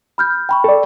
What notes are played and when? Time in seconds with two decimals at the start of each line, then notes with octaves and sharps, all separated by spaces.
0.18 B5 F6 G6
0.49 G5 B5 C#6
0.64 A4 D5